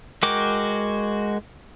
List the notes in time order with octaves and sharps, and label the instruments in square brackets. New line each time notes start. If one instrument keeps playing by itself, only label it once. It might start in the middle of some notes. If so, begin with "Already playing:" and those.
[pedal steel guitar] G#3 F#4 A#4 G5 D6